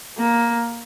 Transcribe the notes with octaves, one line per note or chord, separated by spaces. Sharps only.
A#3